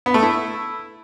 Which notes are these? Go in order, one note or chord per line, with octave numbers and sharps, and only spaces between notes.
B3
A3
E4